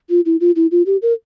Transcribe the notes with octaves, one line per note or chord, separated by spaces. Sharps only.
F4
E4
F4
E4
F4
G4
A#4